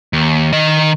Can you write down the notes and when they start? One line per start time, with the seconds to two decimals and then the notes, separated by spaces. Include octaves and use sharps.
0.13 D#2
0.53 D#3 D#5